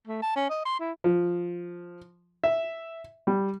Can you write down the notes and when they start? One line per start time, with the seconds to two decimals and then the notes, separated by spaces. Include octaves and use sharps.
0.07 A3
0.22 A5
0.36 C#4
0.50 D#5
0.65 C6
0.80 E4
1.04 F3
2.44 E5
3.27 G3